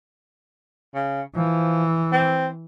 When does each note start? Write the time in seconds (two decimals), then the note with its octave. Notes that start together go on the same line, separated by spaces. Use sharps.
0.94 C#3
1.36 E3 F3
2.12 C4